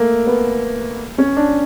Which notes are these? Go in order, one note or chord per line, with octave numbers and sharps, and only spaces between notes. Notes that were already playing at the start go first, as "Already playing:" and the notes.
Already playing: A3 A#3
B3
C#4
D4